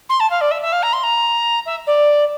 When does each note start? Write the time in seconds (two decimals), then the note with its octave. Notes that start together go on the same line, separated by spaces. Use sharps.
0.09 C6
0.20 A5
0.30 F5
0.41 D5
0.51 E5
0.62 E5
0.72 F5
0.82 A#5
0.93 C6
1.03 A#5
1.66 E5
1.86 D5